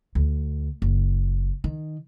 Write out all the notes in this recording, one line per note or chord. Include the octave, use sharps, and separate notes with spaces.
D2
F#1
D#3